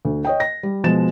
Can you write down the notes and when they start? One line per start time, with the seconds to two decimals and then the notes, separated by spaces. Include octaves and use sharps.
0.05 D2
0.25 C#5 D#5 G5
0.40 A#6
0.63 G3
0.84 B2 F3 G#3 A6 E7